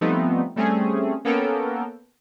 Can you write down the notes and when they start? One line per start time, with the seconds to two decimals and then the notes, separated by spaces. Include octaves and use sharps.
0.01 F3 G3 A3 B3 C4 D#4
0.56 G3 A3 C4 C#4 G#4
1.25 A#3 B3 C#4 A4 A#4 G5